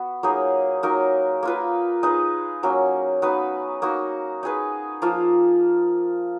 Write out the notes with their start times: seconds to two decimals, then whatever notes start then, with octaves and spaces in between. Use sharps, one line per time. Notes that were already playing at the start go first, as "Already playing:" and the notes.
Already playing: B3 F#4
0.23 F#3 A#3 D#4 G#4
0.83 F#3 A#3 D#4 A#4
1.43 A#3 F4 B4
2.03 G#3 D#4 G#4 B4
2.63 F#3 A#3 C#4
3.22 B3 D#4 F#4 B4
3.82 A#3 D#4 F#4
4.43 D#4 G#4 B4
5.02 F3 A#3 F4